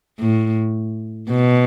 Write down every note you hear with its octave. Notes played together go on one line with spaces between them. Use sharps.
A2
B2